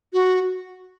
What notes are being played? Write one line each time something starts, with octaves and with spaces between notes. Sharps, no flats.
F#4